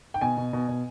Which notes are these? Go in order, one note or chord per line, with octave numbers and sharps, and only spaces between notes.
G5
B2 G#5
B2
B2
B2